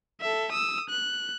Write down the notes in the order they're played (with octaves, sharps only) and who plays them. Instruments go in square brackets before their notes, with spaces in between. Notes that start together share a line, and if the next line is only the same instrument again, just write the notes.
[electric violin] A4 E5
D#6 E6
F#6